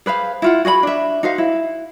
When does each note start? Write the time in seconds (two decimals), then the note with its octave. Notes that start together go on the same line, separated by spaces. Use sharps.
0.06 G#4 B4 C5 F5
0.42 E4 F4 F#5
0.65 F#4 G#4 F5 B5
0.83 D4 E5
1.23 D#4 F#4 C5 F5
1.38 E4